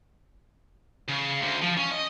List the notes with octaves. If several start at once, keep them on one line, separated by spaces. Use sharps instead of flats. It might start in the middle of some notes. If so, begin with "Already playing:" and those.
C#3
D2
F3
C#4
D#5